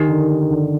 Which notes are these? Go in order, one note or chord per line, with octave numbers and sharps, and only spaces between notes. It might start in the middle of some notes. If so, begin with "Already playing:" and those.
Already playing: D#3 D#4 G4 A#4
D3
D3